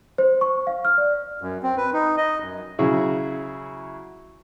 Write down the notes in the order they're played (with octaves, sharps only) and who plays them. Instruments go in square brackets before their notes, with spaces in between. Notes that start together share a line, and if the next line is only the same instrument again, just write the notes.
[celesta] C5
C#6
F5
F6
D5
[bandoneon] F#2
C4
B4
D#4
D#5
F#2
[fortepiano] C#3 F#3 E4 F#4 G#4